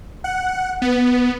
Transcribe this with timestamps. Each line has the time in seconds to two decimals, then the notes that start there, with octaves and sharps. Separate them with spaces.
0.24 F#5
0.82 B3